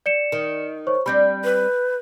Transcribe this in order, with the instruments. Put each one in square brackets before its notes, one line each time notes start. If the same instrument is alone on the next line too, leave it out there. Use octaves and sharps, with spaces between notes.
[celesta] D5 C#7 E7
[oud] D#3
[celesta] C5 C#5 C#6
[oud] G3 C4 D4 [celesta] B5 G6
[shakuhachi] B4